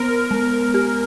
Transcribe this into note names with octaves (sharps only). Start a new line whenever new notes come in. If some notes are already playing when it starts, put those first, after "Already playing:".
Already playing: B3 A#4
G#3
G4